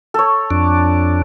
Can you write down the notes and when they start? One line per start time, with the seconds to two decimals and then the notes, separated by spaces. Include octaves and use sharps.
0.14 A4 C#5
0.51 F2 D4